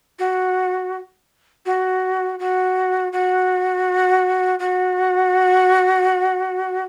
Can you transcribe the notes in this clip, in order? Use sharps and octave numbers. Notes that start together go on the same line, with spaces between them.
F#4
F#4
F#4
F#4
F#4